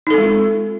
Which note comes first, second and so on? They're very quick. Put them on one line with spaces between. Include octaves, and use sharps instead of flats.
D#4 A4 C4 G#3 F4